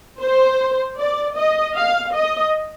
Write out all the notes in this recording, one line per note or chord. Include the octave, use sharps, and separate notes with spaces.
C5
D5
D#5
F5
D#5